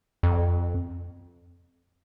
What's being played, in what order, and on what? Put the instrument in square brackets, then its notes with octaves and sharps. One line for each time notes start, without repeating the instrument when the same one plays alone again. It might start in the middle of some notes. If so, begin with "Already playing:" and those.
[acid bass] F2